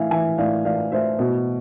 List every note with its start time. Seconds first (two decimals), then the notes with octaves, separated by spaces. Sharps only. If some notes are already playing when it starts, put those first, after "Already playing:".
Already playing: A2 E3 E5 F5 G#5
0.11 E3 E5 G#5
0.38 A2 D5 F5
0.65 E3 D5 F5
0.92 A2 C5 E5
1.19 B2